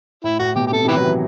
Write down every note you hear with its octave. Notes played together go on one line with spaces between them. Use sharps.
A2 E4
A2 F#4
B2 G4
G4
C3 A4
C3
D#3 E4 G4 B4
F#3
E3